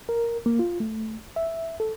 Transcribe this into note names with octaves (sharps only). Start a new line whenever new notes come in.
A#4
A#3
F4
A3
E5
A4